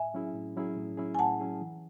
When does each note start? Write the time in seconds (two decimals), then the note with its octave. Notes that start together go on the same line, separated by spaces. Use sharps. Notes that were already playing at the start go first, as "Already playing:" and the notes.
Already playing: A2 E5 G#5
0.14 F#3 C#4 E4 G#4
0.34 A2
0.56 F#3 C#4 E4 G#4
0.77 A2
0.97 F#3 C#4 E4 G#4
1.15 G#5
1.19 A2 F#5 A5
1.40 F#3 C#4 E4 G#4
1.61 E3